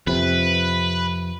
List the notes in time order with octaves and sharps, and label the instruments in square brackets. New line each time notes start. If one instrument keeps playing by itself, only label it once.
[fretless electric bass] F2 C3 [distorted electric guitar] B4